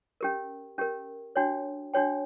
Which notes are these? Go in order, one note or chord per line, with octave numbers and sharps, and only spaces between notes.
C#4 G4 A#4
C#4 G4 A#4
D4 F#4 C#5 G5
D4 F#4 C#5 G5